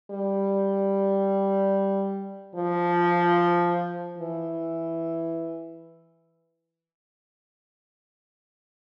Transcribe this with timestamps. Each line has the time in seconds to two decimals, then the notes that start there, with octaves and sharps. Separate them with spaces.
0.11 G3
2.56 F3
4.18 E3